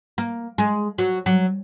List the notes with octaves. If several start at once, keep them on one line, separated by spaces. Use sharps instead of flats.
A#3
G#3
F#3
F#3